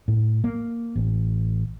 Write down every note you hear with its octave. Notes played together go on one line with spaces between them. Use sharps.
A2
A#3
A1